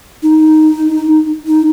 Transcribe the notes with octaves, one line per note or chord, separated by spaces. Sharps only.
D#4
D#4